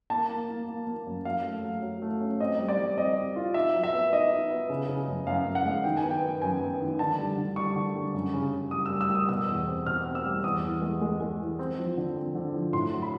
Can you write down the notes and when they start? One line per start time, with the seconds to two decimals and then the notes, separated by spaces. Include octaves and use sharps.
0.10 A#3 A5
0.29 A#3
0.49 A#3
0.68 A#3
0.87 A#3
1.07 F#2
1.25 F#3 F5
1.44 A3
1.63 F#3
1.82 F#3
2.02 A3
2.21 C#4
2.40 C4 D#5
2.59 G3
2.69 D5
2.79 G3
2.98 C4 D#5
3.16 C4
3.36 F4
3.54 D#4 E5
3.74 F#3
3.84 E5
3.93 B3
4.13 D#4 D#5
4.32 D#4
4.50 B3
4.70 C#3
4.88 C#3
5.08 F#2
5.27 F#2 F5
5.46 F#2
5.55 F#5
5.65 G#3
5.84 D#3 G5
5.97 G#5
6.04 B3
6.11 G5
6.23 B3
6.42 F#2 G#5
6.61 B3
6.81 D#3
6.99 D3 A5
7.19 G3
7.38 D3
7.56 G3 C#6
7.76 D3
7.94 G3
8.14 F#2
8.34 C#3
8.53 C#3
8.71 G3 D#6
8.86 G3 E6
9.01 E6
9.10 G3
9.15 D#6
9.29 B2 E6
9.49 E2
9.67 C4
9.86 B2 F6
10.06 C4
10.15 E6
10.25 G3
10.44 E2 D#6
10.64 E3
10.82 G#3
11.01 G#3
11.20 G#3
11.40 E3
11.59 C4
11.78 F3
11.97 D3
12.16 C4
12.35 D3
12.54 F3
12.73 A2 C6
12.93 F#3
13.02 B5